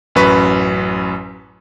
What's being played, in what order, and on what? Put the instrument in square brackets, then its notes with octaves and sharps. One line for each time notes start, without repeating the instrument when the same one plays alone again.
[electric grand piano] A1 F#2 F#3 B4 C#6 B6